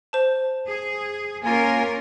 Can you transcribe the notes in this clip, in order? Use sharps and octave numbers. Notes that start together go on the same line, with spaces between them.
C5 A5
G#4
A#3 C#4 F4 A#4 G#5